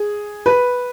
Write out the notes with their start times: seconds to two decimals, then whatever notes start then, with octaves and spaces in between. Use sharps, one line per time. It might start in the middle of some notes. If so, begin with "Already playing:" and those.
Already playing: G#4
0.46 B4